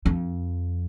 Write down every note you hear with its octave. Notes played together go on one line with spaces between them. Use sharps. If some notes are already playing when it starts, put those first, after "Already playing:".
F2